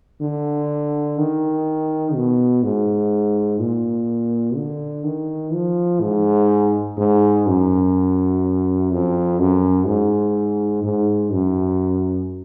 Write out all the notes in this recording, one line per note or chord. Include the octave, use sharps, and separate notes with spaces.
D3
D#3
B2
G#2
A#2
D3
D#3
F3
G#2
G#2
F#2
F2
F#2
G#2
G#2
F#2